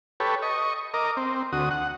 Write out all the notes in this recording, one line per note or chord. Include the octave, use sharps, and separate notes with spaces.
G4 A4 B4 C#5
D#5 C#6
A#4 D#5 D6
C4
D2 F#4 D#6
F#5